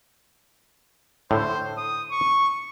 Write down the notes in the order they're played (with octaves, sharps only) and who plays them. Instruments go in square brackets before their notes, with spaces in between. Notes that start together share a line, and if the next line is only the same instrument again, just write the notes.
[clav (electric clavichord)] A2 D3 [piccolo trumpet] C5
[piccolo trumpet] D#6
C#6